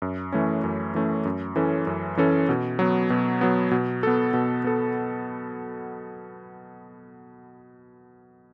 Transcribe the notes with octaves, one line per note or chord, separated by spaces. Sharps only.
F#2
E3 A3 C#4
F#2
E3 A3 C#4
F#2
E3 C#4 A4
F#2
E3 C#4 A4
B2
F#3 B3
B2
F#3 B3
B2
B3 A4
B2
B3 A4